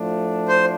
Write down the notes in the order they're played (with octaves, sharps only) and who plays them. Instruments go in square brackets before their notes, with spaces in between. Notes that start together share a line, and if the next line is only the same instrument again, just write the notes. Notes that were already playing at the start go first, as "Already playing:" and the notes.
Already playing: [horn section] A2 F3 A3 D4
[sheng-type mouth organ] C5